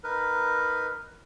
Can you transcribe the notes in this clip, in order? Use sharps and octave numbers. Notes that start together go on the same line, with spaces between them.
D#4 A#4 B4